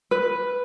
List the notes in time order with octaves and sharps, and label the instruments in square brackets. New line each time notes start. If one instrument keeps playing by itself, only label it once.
[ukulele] B4